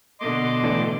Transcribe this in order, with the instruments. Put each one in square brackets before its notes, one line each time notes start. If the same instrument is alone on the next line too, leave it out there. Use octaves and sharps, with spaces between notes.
[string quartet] B2 D3 [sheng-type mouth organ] D#5 C6 D6
[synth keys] A2 E3 D4